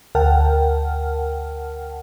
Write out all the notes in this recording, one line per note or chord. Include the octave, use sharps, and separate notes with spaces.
D2 A#4 F#5 G5 A5 F6